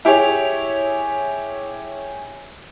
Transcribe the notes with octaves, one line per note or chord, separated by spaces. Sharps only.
E4 G4 G#4 C#5